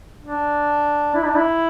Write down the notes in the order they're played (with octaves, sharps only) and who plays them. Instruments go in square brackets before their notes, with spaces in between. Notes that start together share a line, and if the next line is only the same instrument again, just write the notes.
[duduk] D4
E4
D4
E4